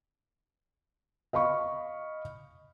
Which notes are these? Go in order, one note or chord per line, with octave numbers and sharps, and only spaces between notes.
D#5 F5 B5 C#6